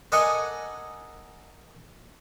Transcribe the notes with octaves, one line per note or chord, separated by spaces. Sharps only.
A4 A#4 D5 D#5 F#5 G#5